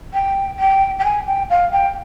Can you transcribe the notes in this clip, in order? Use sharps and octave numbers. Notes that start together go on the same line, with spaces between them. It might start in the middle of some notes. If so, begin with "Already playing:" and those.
G5
G5
G5
G#5
G5
F5
G5